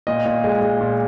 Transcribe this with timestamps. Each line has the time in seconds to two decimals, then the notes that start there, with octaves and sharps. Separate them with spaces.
0.07 A#2 D#5
0.26 A#2
0.44 G#3
0.61 G#3
0.81 A#2